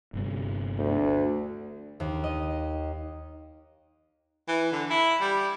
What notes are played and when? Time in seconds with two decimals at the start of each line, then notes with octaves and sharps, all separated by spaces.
0.14 G1 G2 C3
0.79 D2
2.00 D#2
2.24 D#5
4.48 E3
4.72 D3
4.90 E4
5.20 G3